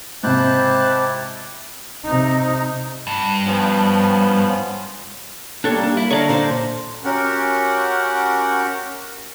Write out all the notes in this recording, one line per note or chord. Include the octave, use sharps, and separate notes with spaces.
G#2 C3 E4 G4 C5 A5 F#6
C3 D#4
G2
F3 B3 C#4
G3 A#3 D4 A4 C#5
D4
E4
D3 C#5 D5 F5 A#5
A#2 D4 C5 D5
C#4 F#4 G4 A#4 F#5